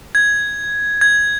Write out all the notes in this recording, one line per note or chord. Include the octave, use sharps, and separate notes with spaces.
G#6
G#6